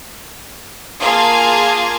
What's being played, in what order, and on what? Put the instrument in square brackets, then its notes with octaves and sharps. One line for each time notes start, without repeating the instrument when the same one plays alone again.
[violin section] A#3 F4 G#4 F5 A5 G#6